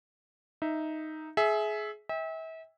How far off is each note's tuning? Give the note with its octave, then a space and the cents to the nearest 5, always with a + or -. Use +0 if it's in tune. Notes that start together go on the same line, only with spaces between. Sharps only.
D#4 +0 E5 +0
G#4 +25 E5 -5
E5 -35 G5 +30